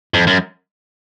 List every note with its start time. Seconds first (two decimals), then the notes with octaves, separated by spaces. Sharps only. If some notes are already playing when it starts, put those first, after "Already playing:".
0.14 F2
0.27 F#2